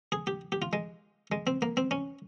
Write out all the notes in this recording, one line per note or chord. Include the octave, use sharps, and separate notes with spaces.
G#4
G4
G4
F4
G#3
G#3
C4
A#3
C4
C#4